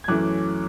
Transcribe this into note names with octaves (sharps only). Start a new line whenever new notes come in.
G#6
F#2 E3 A3 C#4 D6 F#6